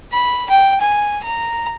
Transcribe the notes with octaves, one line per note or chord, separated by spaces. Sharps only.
B5
G5
G#5
A#5